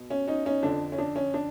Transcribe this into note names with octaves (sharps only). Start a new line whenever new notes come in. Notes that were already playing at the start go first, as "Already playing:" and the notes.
Already playing: B2
C#4
C#4 D#4
C#4 D#4
F2 D3 F3 D4
C#4
D4
C#4
D4